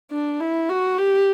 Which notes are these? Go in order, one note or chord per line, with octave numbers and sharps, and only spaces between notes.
D4
E4
F#4
G4